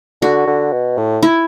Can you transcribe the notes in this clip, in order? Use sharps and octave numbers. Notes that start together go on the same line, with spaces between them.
D3 F#4
D3
B2
A2
E4